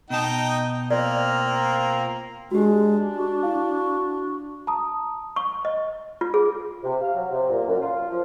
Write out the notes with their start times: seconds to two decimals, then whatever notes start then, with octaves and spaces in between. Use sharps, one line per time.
0.10 B2 D#4 D#5 G5 A5
0.91 A#3 C4 F4 D5 A#5
2.51 G#3 D4 F#4 G4
3.15 F#4
3.43 E4 F5
4.67 A5 A#5 D#6
5.36 C#6
5.65 D#5
6.21 F4
6.34 G#4
6.84 C3
7.01 F5
7.15 F#3
7.31 C3
7.49 A#2
7.67 F#2
7.81 F4
8.09 F3